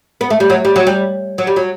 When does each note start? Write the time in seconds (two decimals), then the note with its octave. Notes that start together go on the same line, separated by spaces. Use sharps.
0.21 B3
0.30 A3
0.40 G3
0.50 F#3
0.65 G3
0.76 F#3
0.87 G3
1.38 F#3
1.47 G3
1.56 F#3